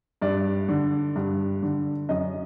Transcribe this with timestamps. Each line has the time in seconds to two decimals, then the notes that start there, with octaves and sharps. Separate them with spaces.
0.22 G2 D5
0.69 D3
1.16 G2
1.63 D3
2.09 F#2 D#5